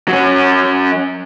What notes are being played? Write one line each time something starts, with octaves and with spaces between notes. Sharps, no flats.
F#3 C#4